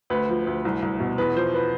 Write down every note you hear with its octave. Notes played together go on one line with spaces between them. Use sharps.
D2 B4
F3
D2
C2
C2
B2
E2 B4
F3 C5
B4